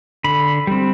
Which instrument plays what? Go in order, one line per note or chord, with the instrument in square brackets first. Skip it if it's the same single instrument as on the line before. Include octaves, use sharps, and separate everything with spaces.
[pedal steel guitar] D3 B5
G3 C4